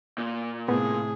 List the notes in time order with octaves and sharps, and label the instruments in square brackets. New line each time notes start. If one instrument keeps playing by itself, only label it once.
[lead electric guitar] A#2
[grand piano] A2 C3 [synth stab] B3 [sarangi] G#4